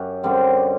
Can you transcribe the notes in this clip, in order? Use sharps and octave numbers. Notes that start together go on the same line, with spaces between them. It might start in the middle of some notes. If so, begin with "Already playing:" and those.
Already playing: F#2 G4
F#2 D3 G3 C4